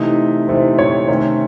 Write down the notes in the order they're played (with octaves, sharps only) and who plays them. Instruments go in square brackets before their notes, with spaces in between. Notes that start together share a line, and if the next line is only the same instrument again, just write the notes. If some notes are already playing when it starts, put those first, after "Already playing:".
Already playing: [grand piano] C3 E3 A3 D#4
[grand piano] C3 E3 A3 D#4 [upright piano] C5
[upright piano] C#5
[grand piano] C3 D#3 A3 C#4 [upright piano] C#5